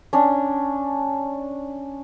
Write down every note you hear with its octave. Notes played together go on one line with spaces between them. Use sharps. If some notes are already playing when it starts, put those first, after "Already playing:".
C#4 D4